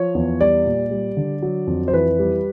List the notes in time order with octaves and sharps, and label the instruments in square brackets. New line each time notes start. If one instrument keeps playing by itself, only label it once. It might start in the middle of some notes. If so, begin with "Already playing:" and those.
Already playing: [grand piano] F3 C#5
E2
G3 D5
A#2
G3
D3
F#3
F2
C5
E3 B4
G3